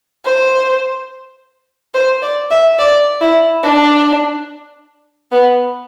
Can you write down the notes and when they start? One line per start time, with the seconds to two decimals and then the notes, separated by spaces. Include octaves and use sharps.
0.25 C5
1.94 C5
2.22 D5
2.50 E5
2.79 D5
3.21 E4
3.63 D4
5.32 B3